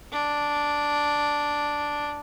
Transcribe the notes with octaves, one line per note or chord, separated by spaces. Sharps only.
D4